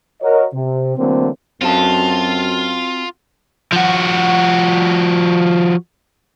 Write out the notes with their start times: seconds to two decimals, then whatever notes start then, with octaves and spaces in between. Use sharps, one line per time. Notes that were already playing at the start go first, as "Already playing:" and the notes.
0.22 F#4 A#4 C#5 D#5
0.54 C3
0.98 D3 E3 F#3 A3 A#3 C4
1.61 F#2 C4 F4 F#4 A4
3.72 F3 F#4